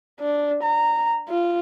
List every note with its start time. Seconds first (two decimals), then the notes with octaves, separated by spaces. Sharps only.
0.20 D4
0.63 A#5
1.29 F4